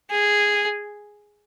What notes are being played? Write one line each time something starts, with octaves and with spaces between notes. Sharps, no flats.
G#4